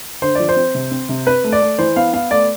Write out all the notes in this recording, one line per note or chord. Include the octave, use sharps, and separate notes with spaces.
D3 C5
F3 D5
C5
C4
C3
C4
C3
C4 B4
A3
D5
A3
E3 C5
B3 F5
B3 F5
A3 D5